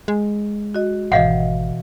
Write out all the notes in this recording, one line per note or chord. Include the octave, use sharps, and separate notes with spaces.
G#3
F#4 D#5
G#1 B2 E3 D#5 F5 F#5